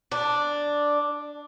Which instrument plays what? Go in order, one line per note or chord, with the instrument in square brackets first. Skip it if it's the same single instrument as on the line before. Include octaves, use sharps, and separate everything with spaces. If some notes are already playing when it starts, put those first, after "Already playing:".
[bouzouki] D4